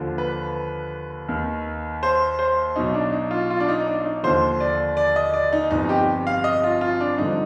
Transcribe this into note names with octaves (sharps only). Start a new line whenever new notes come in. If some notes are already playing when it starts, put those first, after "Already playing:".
Already playing: D#2 D3 F3
B4
D#2 D#3
C5
C5
B1 B2 D#4
D4
D#4
F4
F4
D4
D#4
D4
D#4
D#2 D3 F3 C5
D5
D5
D#5
D5
D#4
G1 F2 C3 D#4
G4
F5
D#5
F4
F4
D4
G#1 G2 D3 F3 D#4